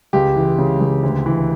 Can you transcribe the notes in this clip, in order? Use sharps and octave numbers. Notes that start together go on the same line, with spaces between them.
C#2 G4
E3
C#3
C#2
D2
E3